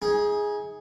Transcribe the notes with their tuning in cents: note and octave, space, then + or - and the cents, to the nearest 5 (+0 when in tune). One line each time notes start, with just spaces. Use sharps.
D#4 +40 G#4 +0